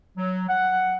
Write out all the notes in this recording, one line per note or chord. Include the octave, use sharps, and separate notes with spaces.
F#3
F#5